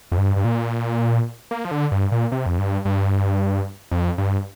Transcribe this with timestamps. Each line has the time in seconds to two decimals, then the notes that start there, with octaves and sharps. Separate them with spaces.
0.12 F2
0.18 G2
0.36 G2
0.45 A#2
1.51 A#3
1.65 F3
1.71 D3
1.92 G2
2.12 A#2
2.32 C3
2.46 F2
2.58 G2
2.85 G2
3.91 F2
4.18 G2